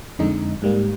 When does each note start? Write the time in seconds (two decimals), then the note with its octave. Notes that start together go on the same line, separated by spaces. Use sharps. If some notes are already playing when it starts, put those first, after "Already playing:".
0.19 F2 D3 G#3 D#4
0.62 G#2 G3 A#3